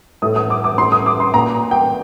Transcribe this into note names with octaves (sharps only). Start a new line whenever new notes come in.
A2 D#6
D#6
D6
D6
A2 C6
D#6
D6
C6
A#2 A#5
G5